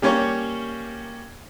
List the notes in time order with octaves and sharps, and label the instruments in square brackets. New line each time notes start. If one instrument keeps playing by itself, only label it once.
[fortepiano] G3 A#3 C#4 C#5 C#6